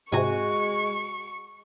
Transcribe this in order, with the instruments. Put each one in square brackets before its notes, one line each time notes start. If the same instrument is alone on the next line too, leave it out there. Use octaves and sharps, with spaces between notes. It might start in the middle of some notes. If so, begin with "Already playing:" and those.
[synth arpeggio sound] G#2 C3 [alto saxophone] G#3 [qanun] F#4 G#5 [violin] C#6